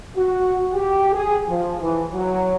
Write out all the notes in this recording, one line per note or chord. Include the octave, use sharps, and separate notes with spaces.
F#4
G4
G#4
F3
E3
F#3